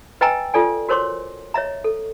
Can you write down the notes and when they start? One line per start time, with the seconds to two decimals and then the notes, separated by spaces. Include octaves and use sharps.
0.21 B4 D#5 G5 G#5 A#5 E6
0.54 F4 A4 D5 G#5
0.89 F#4 A#4 C5 C#5 C6 D6
1.54 C#5 D#5 E5 A#5
1.84 A4